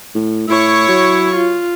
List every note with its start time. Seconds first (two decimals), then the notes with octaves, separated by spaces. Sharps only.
0.15 A2
0.48 A2 E4 C#5 C#6
0.89 F#3
1.35 F4